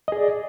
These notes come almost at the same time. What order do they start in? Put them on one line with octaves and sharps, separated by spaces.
D#5 G#4 D5